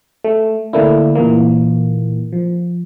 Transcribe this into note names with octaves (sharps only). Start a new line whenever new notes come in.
A3
D3 A3 A#3 D4 E4
A#2 E3 A#3
F3